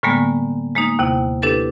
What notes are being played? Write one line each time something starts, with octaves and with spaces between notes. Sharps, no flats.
A2 D3 G3 G#3 A#3 B3
G#3 A#3 D#4
D#2 C3 E4
D4 E4 G4 A4 B4